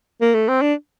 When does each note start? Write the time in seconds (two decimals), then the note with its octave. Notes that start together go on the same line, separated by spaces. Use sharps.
0.22 A#3
0.35 A3
0.49 C4
0.62 D4